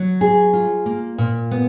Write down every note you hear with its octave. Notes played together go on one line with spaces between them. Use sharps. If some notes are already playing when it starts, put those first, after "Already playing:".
Already playing: F#3
G#4
F4
A#3
A#2
B3